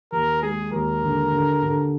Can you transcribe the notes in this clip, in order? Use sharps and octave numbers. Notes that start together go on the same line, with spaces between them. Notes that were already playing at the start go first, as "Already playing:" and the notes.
D#2 A#4
G#3 G#4
D#2 A#4
D3
D3
D3